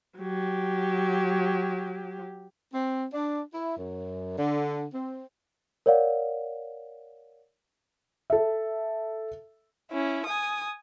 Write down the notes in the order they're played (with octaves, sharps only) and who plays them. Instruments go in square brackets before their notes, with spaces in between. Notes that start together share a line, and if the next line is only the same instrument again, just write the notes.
[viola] F#3 G4
[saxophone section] C4
D4
E4
F#2
D3
C4
[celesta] A#4 C#5 D5 F5 F#5
[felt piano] A4 E5
[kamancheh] C#4 E4
G#5 D#6